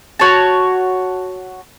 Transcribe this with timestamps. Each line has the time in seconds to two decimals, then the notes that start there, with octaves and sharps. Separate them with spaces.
0.20 F#4 C#5 A5